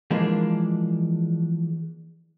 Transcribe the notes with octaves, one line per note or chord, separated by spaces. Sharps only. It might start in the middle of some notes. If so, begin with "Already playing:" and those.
E3 F3 G#3 A#3 D4